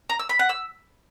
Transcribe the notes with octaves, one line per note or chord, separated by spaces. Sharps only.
A#5
E6
B5
F#5
E6